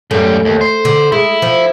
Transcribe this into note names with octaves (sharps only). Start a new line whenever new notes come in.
F#2 G3 A3
D#2
C5
D3
G#3 E4
F3